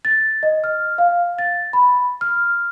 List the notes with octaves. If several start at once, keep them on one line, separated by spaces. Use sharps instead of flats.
A6
D#5
F6
F5
A6
B5
F6